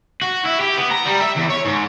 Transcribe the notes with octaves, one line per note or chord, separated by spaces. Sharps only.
F#4
E4
G4
B3
A#5
G3
E5
E2
C#5
G#2